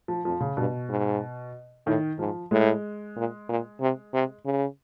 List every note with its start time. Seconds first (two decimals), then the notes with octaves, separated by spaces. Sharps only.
0.08 F3
0.25 F2 F3
0.40 C#3
0.57 G2 B2
0.89 G#2
1.86 A2 D#3
2.19 G#2 F3
2.51 A2 G#3
3.16 A#2
3.49 A#2
3.80 C3
4.13 C3
4.45 C#3